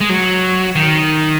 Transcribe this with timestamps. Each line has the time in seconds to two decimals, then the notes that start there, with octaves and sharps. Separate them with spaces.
0.01 G#3
0.10 F#3
0.76 D#3